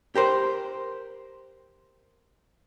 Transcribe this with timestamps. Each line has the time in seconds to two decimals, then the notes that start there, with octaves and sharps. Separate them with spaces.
0.15 G4 A#4 C5